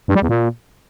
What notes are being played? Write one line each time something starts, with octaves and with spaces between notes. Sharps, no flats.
G2
G3
E2
A#2